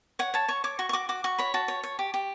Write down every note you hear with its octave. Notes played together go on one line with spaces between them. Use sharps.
C#5 F#5
C#5 A5
C#5 C#6
C#5 D6
F#4 C#6
C#6
F#4 D6
F#4 D6
F#4 C#6
C#5 B5
F#4 A5
C#5
C#5
G4
G4